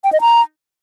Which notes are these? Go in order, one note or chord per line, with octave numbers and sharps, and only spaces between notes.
G5
D#5
A#5